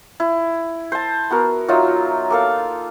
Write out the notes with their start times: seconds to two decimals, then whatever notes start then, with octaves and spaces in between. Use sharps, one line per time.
0.20 E4
0.92 C5 A5
1.30 B3 F#4 A#4
1.68 F#3 D#4 F4 E5
2.30 A#3 A4 F5